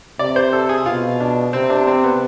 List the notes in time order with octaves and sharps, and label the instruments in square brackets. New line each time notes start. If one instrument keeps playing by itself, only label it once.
[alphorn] C3 [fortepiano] D5
[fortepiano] C5
A4
G#4
[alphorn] B2 [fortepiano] F4
[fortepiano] D4
[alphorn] C3 [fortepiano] C4
[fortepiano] D4
C4
B3